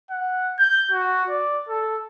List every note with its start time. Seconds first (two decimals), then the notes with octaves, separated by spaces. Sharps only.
0.10 F#5
0.59 G6
0.91 F#4
1.29 D5
1.69 A4